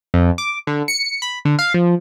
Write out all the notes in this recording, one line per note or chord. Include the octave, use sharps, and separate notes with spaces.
F2
D6
D3
C#7
B5
D3
F5
F3